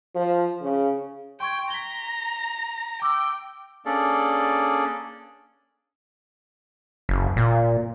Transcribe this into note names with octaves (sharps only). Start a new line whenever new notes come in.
F3
C#3
G5 C6 C#6 G#6
A#5 B6 G7
G5 D6 E6
A#3 C#4 D4 G#4 A4 D5
F#1
A#2